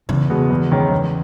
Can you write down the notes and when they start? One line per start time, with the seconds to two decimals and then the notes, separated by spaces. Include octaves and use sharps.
0.09 E2 C#3
0.30 B2 G#3 B3
0.50 E2
0.72 D#3 G#3 C#4
0.92 E2